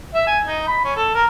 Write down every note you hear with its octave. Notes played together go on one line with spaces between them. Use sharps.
E5
G#5
D#4
B5
C#4
A4
A#4